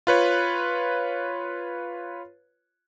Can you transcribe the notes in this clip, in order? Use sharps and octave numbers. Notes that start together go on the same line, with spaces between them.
F4 B4 C#5